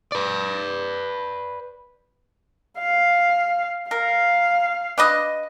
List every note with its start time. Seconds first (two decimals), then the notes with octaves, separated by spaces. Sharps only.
0.12 B4 D5
2.79 F5
3.91 A#4 F5
4.98 D4 B4 D#5